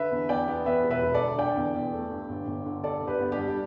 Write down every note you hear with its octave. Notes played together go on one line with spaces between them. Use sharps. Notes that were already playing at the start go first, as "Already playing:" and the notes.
Already playing: D3 B4 E5
E2
E2 D5 G5
B3
E2 B4 E5
E1
B4 E5
E1
A4 D5
D3
D3 D5 G5
E2
E2
A3
G2
G1
G1
D3
G2 A4 D5
G1
G4 B4
B3
D4 G4
G3
D4